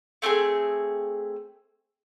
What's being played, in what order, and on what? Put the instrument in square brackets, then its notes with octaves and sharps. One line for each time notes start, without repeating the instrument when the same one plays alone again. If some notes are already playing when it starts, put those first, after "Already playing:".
[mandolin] A3 C4 F#4 G#4